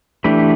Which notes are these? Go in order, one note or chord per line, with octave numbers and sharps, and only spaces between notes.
E3 A3 D4 G4 B4